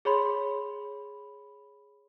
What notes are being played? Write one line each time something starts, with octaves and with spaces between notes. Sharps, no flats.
G#4 C#5 B5 C6